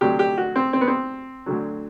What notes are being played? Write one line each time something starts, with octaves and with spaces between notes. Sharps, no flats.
D2 C3 F#3 G4
G4
F#4
C4
C4
B3
C4
D2 D3 F#3